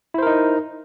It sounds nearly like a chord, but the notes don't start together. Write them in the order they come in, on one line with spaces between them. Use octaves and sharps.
E4 C5 A#4 D#4